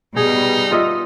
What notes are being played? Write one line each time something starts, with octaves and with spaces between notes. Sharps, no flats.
B2 G3 D#4 G#4
F4 D#5 E5